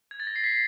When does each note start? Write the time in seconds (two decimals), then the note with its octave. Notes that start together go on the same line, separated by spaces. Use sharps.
0.11 G#6
0.20 A6
0.27 A#6
0.36 C7
0.44 B6